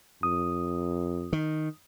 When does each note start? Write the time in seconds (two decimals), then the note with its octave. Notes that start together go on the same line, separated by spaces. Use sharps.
0.23 F2 D#6
1.33 D#3